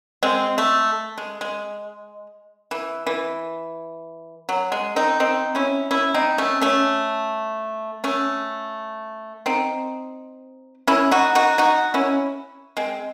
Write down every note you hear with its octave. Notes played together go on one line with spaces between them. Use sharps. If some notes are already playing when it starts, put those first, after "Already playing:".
G#3 C4
A3
G#3
G#3
E3
E3
F#3
G#3
C4 D#4
C4 D#4
C#4 E4
C#4 E4
C4 D#4
A3 C#4
A3 C#4
A3 C#4
C4 D#4
C#4 E4
D#4 F#4
D#4 F#4
D#4 F#4
C#4 E4
G#3 C4